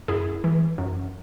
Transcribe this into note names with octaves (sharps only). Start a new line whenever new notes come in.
F#2 E4 G#4
E3
F#2